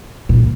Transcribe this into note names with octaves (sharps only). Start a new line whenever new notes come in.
A#2